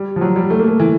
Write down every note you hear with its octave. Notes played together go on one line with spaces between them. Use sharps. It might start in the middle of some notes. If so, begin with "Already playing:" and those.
Already playing: G3
F3
F#3
G3
A3
A#3
A3
E3